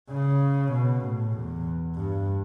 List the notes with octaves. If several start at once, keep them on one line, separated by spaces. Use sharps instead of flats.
C#3
B2
A2
E2
G2